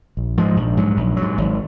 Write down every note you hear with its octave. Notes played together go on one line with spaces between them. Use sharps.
A#1
G#2 F3 G#3
A#1
G#2 F#3
A#1
F#3
G#2
G#1